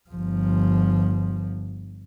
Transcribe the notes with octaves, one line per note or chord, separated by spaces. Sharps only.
G1 F3